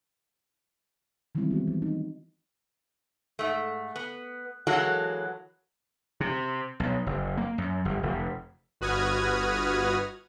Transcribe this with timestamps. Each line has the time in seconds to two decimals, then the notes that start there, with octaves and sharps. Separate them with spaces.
1.35 D#3 E3 G3 G#3 C4 E4
1.51 B3 F#4
1.68 E3
1.82 D#4
3.39 G#2 A3
3.96 B3
4.67 E3 F#3 G#3 A#3 F#4 A4
6.21 C3
6.80 B1
7.06 F#1
7.37 A#3
7.58 F#2
7.85 G1
8.03 F1
8.81 G1 F#4 B4 D#6 F6 G#6